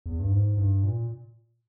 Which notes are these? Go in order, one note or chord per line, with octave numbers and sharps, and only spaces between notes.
E2
G2
G#2
G2
A#2